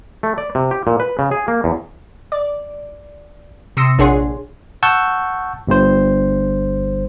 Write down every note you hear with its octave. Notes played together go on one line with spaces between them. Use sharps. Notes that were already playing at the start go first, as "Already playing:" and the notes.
A3
D5
C3
G4
A#2
B4
C#3
G#4
A#3
E2
D5
C3 C6 D#6 E6 A#6 C#7
A#1 D4 G#4 C#5 F#5 C6
F#5 A5 C#6 E6 G6
G1 G2 C5